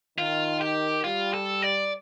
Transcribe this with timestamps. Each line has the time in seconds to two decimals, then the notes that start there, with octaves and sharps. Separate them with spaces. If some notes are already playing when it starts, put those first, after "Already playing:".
0.18 D#3 F4
0.61 G4
1.04 G3 F4
1.34 A4
1.62 D5